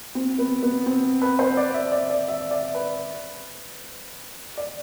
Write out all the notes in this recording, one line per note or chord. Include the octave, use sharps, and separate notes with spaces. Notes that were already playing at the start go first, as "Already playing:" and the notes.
C4
B3
B3
C4
B4
C5
D5
E5
D5
D5
E5
D5
B4
D5